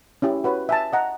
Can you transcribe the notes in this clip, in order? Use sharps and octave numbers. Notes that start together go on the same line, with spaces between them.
C#4 E4 G4
F#4 B4 C#5
E5 G#5 A5
D#5 F#5 A#5